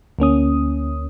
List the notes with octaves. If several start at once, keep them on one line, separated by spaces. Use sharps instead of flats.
D2 A#3 C#4 D#6